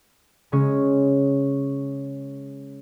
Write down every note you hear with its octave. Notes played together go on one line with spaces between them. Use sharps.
C#3 G#3 C#4 C#5